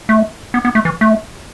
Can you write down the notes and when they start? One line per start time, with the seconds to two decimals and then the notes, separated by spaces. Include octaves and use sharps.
0.09 A3
0.54 B3
0.65 B3
0.75 A3
0.85 E3
1.01 A3